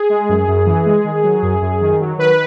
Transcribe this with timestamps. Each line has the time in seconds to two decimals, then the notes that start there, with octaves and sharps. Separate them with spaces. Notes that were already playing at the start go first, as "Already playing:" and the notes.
Already playing: G#4
0.09 G#3
0.29 F#2
0.48 F#2
0.67 E3
0.86 G#3
1.05 D#3
1.24 F#3
1.43 F#2
1.62 F#2
1.81 D#3
2.00 F#3
2.18 D#3 B4